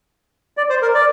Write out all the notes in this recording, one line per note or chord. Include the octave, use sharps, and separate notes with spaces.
D5
C5
A#4
D5